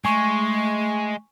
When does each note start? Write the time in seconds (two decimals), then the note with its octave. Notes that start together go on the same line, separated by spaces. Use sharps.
0.05 G#3 A3 G#5 C#6